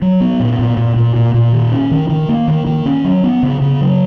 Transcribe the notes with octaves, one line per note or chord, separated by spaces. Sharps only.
F#3
B3
A#2
A#2
A#2
A#2
A#2
A#2
D#3
C#4
D#3
D#3
A#3
D#3
D#3
C#4
F#3
B3
C#3
C#3
F#3